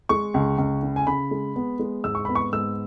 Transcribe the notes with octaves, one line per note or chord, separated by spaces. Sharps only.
G#3 C#6
C#2
C#2
C#3
G#5
C#3 B5
G#3
B3
G#3
G#2 E6
C#6
B3 B5
C#6
G#2 E6